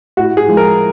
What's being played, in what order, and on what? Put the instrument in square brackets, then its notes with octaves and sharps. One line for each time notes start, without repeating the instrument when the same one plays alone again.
[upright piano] A2 F#4
G#4
F3 G#3
A#4